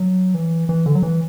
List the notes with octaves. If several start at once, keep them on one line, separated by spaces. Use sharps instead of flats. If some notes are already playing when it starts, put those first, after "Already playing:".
Already playing: F#3
E3
E3
D3
F#3
E3